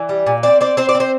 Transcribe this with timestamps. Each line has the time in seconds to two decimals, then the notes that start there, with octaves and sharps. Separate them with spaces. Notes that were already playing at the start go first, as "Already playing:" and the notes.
Already playing: E3 D5
0.09 G3
0.27 A#2
0.43 C4 D5
0.61 C4 D5
0.77 C4 C5
0.89 D5
0.95 C4
1.00 C5